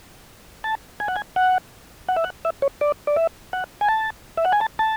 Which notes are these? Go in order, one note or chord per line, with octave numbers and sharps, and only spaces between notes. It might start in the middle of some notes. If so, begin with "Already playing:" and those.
A5
G#5
F#5
G#5
F#5
F#5
E5
F#5
E5
C#5
D5
D5
E5
F#5
G#5
A5
E5
F#5
G#5
A5
A5